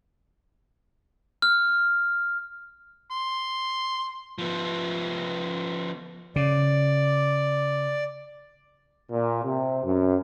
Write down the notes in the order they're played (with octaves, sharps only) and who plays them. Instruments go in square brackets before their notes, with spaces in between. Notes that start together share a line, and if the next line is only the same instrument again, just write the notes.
[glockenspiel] F6
[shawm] C6
[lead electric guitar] F3 B3
[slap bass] C#3 [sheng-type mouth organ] D5
[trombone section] A#2
C3
F#2